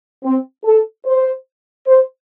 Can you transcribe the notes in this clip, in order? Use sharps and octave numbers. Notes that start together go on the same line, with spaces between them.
C4
A4
C5
C5